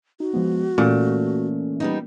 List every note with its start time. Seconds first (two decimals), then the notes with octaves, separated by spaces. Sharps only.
0.20 D#4 F#4
0.33 F3 G#3 B3
0.78 A#2 E3 A3 C#4
1.80 G3 B3 D#4